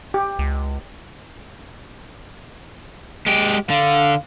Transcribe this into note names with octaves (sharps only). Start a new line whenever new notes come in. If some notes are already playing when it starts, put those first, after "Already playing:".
G4
C#2
G#3 G4
D3 F5